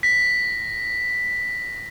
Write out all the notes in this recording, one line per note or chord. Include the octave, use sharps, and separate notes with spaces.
A#6 B6